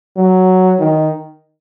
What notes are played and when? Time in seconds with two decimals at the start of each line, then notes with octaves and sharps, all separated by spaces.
0.17 F#3
0.80 D#3